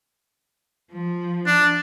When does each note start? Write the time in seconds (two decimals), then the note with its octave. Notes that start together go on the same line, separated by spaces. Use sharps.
0.92 F3
1.46 D4